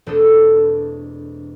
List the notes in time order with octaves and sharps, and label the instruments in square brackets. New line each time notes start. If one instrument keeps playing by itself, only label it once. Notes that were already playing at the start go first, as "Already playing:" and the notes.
[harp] E1 A3 C4 D4 A4 D#6